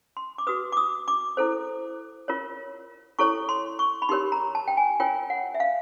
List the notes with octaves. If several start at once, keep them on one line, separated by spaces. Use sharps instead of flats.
C6
D6
F#4 B4 D#6
D6
D#6
D6
E4 A4 C5
F4 A#4 C#5
E4 A4 C#5 C#6
C6
C#6
B5
D#4 G4 A#4 C#5 C6
A#5
A5
G5
G#5
F4 A#4 C#5 G5
F#5
E5
F5